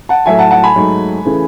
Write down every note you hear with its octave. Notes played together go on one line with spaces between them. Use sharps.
F#5 A5
A2 F#3 A3 E5 G#5
F#5 A5
F#5 A5
G#5 B5
G#2 F#3 A3
C#3 E3 A3